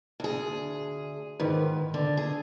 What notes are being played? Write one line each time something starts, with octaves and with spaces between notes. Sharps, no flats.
D2 G#4
G#2 D#3 B4
D3
G#4